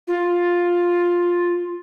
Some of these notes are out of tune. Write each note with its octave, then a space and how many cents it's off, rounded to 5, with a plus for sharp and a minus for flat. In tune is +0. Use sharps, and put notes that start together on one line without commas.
F4 +5